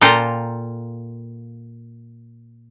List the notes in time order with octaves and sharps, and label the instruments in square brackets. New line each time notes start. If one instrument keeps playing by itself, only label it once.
[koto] A#2 F4 A4 G5 A#5